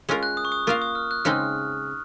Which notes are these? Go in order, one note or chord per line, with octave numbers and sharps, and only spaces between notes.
G#3 C#4 F4 A#4
F#6
D#6
C#6
D#6
A#3 F4 A#4 F5 C#6
D#6
F6
F#6
C#3 G#3 C4 D#4 F6